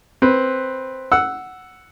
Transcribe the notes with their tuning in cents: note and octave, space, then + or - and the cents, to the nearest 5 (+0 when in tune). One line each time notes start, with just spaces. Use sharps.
C4 +0 B4 +0
F#5 +0 E6 +0